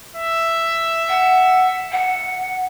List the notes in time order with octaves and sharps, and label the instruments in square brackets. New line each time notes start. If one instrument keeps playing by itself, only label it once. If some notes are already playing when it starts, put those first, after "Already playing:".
[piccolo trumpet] E5
[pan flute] F#5
F#5